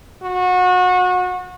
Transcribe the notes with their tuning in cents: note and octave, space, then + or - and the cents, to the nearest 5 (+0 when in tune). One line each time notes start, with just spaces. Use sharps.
F#4 -30